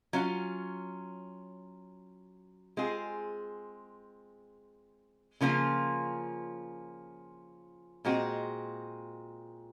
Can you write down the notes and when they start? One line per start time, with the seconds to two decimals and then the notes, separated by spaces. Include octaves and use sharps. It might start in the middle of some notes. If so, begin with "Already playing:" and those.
0.13 F#3 C#4 F4
2.77 G#3 C4 F4 G#4
5.41 C#3 F3 A#3 C#4 F4
8.05 A#2 G#3 C4 F#4